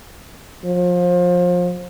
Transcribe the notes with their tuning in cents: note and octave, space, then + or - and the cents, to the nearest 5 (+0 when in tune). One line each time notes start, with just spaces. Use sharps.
F3 +30